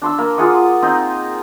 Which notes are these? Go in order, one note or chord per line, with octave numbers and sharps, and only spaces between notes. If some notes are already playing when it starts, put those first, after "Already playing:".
D4 C6 E6
A#3
F4 G#4 F#5 D#6
C4 D#4 D#5